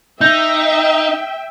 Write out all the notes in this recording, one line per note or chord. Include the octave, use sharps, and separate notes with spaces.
D#4 E5 G5 G6